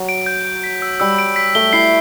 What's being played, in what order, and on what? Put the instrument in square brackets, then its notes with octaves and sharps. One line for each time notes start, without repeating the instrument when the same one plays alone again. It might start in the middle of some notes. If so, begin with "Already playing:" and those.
Already playing: [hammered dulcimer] F#3
[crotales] D7
G6
D7
B6
E6
[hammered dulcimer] G3 [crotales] E6
[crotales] D7
B6
[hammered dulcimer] A3 [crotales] G7
[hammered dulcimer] E4 [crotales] C7